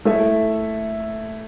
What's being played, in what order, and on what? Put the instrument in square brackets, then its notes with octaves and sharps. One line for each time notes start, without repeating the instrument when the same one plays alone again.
[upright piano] A3 E4 A4 E5